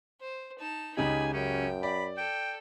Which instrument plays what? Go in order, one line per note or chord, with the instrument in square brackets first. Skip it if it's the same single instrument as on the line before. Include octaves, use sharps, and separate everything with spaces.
[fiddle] C5
D#4 A5
[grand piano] C#2 C#3 G4 [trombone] D#4 [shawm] G#5 [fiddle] B5
[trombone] F#2 [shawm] C#4 [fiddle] G5
[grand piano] D5 [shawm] B5
[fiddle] A4 [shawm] G5